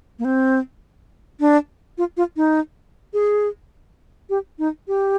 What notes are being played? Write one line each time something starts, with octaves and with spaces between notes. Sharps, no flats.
A#3
C4
D4
F4
F4
D#4
G#4
G4
D#4
G4